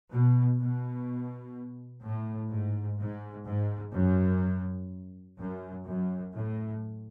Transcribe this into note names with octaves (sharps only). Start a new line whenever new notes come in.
B2
B2
A2
G#2
G#2
G#2
F#2
F#2
F#2
A2